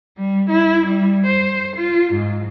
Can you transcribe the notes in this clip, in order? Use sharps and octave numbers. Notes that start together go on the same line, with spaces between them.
G3
E4
G3
C5
F4
G#2